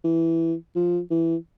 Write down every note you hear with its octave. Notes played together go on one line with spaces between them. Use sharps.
E3
F3
E3